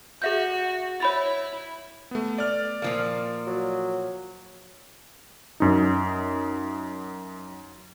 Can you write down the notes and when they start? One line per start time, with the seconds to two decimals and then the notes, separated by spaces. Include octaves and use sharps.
0.22 F#4 G#4 E5 G6
1.00 E4 C#5 B5 A6
2.11 A3 B3
2.38 D5 F6
2.82 A#2 F3 A#3
3.47 F#3
5.60 F#2 D#4